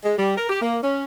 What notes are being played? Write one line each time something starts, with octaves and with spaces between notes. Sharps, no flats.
G#3
G3
A#4
G4
A#3
C#4